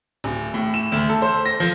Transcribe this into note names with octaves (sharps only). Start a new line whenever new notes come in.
D1
A2
E7
D2
A4
C5
A#6
F3